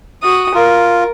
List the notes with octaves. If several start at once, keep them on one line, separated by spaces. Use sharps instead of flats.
F#4 D#6
F4 A#4